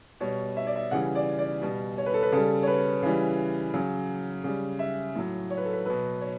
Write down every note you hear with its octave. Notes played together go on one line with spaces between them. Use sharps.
B2 G3 C#5
E5
D5
E5
C#3 E3 G3 F#5
D5
D5
B2 G3
C#5
B4
A4
B4
C#3 G3 A4
C#5
B4
C#3 E3 G3
C#3 F#3
C#3 G3
E5
A2 F#3
C#5
B4
A4
B4
B2 F#3 B4
C#5